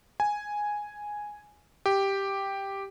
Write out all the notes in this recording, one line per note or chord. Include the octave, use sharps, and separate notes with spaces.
G#5
G4